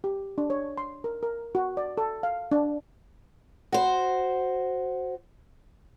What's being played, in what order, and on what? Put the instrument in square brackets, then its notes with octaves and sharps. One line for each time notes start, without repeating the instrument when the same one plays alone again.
[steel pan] G4
D4
C#5
C6
A#4
A#4
F#4
D5
A4
F5
D4
[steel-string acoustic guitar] F#4 C5